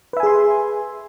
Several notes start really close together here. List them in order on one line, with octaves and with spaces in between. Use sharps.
B4 E5 G#5 G#4 C6